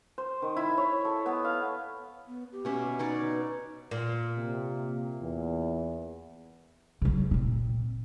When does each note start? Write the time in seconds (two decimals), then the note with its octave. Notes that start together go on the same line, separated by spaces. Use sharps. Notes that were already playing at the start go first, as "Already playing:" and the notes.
0.18 C5
0.42 D#3
0.56 E4
0.78 C#5
1.05 A4
1.26 B3
1.45 F5
2.27 B3
2.52 G4
2.65 B2 C#4 E5
2.99 D#4 B4 C#5 D5
3.91 A#2
4.36 C3 A#3
5.21 E2
7.02 C#3 F#3
7.31 A#2 C4